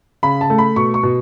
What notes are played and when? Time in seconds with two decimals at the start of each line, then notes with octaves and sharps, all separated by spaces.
0.23 C#3 B5
0.41 A5
0.50 A3
0.58 B5
0.76 B2 C#6
0.94 C#6
1.03 B2